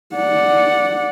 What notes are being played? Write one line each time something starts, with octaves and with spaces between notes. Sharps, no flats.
D5 F#5